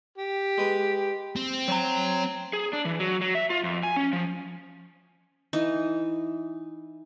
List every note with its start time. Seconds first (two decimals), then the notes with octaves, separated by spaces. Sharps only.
0.18 G4
0.58 G#3 B4
1.36 C4
1.68 F#3 A#5
2.53 G#4
2.73 D4
2.85 E3
3.00 F#3
3.21 F#3
3.35 E5
3.50 F4
3.64 F2
3.83 G#5
3.96 C#4
4.13 F3
5.53 E3 D#4